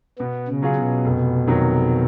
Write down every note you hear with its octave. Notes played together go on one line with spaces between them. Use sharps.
B2 B3
C#3
F#3 C#4 F4 G#4
B2
F1
F2 D#3 F#3